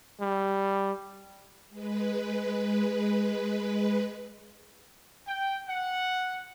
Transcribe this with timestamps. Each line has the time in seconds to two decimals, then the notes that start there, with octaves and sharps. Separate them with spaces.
0.21 G3
1.70 G#3 B4
5.27 G5
5.68 F#5